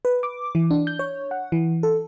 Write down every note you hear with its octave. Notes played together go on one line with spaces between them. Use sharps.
B4
D6
E3
D4
G6
C#5
F#5
E3
A4